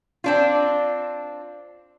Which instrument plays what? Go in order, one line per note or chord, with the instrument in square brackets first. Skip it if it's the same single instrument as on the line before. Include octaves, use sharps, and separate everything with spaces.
[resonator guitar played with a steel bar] C4 D4 F4